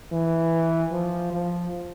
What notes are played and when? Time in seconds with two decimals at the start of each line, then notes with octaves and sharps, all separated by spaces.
0.12 E3
0.91 F3
1.32 F3